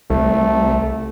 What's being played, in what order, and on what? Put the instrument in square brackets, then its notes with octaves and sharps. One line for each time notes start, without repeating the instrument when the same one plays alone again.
[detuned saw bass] C2 [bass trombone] A3